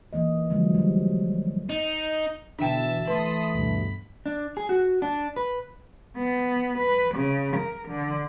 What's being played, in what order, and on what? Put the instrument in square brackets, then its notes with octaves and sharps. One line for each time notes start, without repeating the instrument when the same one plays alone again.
[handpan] E3 A#3 D#5
D3 F3 F#3 G#3
F#3 G3
[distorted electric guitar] D#4
[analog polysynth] B2 D3 E3 [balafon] D4 G5 [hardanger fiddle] E5 A5
[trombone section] E3 A3 [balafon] B4 [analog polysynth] A5 C6 D#6 [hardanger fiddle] B5
[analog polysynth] D2 G2 B2
[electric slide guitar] D4
G#4
F#4
D4
B4
[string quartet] B3
B4
C#3
A#4
D3